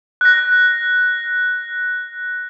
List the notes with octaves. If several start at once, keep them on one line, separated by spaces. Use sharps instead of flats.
F#6 A#6